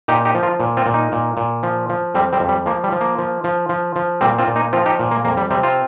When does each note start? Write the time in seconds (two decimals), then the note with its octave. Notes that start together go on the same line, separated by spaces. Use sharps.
0.08 A#2 D#4 G4
0.25 D#4 G4
0.35 F3
0.43 F4 A#4
0.60 A#2
0.77 C4 F4
0.86 A#2
0.94 A#3 D#4
1.12 A#2
1.37 A#2
1.63 F3
1.89 F3
2.15 F2 G3 C4
2.33 G3 C4
2.40 F2
2.49 G3
2.66 F3 A#3
2.84 G3
2.92 F3
3.01 A#3
3.19 F3
3.44 F3
3.69 F3
3.96 F3
4.21 A#2 G3 C4
4.38 C4 F4
4.47 A#2
4.56 A#3 D#4
4.73 F3 C4 F4
4.86 D#4 G4
4.99 A#2
5.11 A#3
5.25 F2 A#3
5.37 G3
5.51 C3 G3 C4
5.63 C4 F4